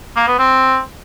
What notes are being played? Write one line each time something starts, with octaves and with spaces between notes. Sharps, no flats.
A#3
B3
C4